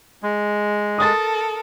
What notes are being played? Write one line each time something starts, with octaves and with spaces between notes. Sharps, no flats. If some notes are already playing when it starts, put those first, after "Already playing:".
G#3
A4 A#4 D#6 A6